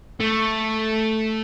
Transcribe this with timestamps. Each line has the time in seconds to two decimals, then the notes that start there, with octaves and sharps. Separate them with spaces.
0.20 A3